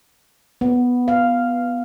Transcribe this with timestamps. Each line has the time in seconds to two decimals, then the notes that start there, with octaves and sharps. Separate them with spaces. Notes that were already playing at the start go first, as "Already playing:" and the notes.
0.61 B3
1.08 F5